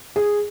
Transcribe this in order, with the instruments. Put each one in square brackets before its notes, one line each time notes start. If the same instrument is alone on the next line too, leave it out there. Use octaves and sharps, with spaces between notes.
[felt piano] G#4